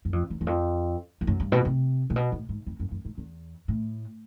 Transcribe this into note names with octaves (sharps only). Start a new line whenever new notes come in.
F#2
F2
E2
E2
F2
F2
F#2
G2
B2
C3
A#2
B2
A2
G#2
F2
F#2
F#2
G#2
E2
A2